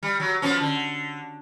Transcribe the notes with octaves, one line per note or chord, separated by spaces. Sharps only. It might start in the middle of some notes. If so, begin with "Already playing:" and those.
G3
F#3
F3 B3 C#4
D3